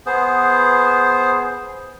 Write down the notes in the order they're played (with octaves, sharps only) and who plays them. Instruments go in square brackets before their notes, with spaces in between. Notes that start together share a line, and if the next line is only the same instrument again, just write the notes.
[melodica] B3 G#4 C5